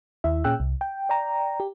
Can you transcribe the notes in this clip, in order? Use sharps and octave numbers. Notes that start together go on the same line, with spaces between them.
D#2 E4 E5
A#2 C#4 G#4 G5 E6 F#6
C2
G5
D5 G5 A#5
G4